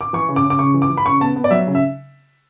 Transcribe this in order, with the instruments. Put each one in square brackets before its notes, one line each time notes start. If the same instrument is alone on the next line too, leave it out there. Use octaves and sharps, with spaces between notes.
[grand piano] D6
E3 C#6
C#3
D6
C#3
D6
C#3 C#6
E3
D6
E3
B5
C#3 C#6
B3 A5
B3
D5
F#3 E5
C#3
E5